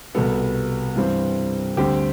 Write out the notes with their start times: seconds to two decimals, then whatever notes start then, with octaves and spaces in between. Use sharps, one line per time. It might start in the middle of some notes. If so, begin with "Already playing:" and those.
0.15 C2 B2 G3 B3 A4
0.96 G2 E3 G3 C4
1.77 D2 D3 G3 C4 G4